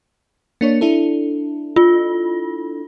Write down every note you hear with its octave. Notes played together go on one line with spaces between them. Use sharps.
A#3 D4 C#5
D4 E4 A4
F4